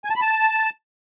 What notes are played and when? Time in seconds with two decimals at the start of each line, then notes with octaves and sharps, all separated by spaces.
0.05 G#5
0.10 A5
0.16 B5
0.21 A5